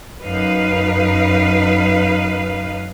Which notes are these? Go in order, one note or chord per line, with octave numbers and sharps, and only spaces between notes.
F#2 D#4 B4 F5